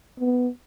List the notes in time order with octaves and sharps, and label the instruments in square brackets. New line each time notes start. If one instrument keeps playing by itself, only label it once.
[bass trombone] B3